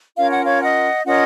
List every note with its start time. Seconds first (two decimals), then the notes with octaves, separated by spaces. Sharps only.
0.17 C#4 F4 A#4 C#5 F5
0.31 F#5
0.44 C#5 F5
0.61 D#5 F#5
1.05 C#4 F4 A#4 C#5 D#5 F#5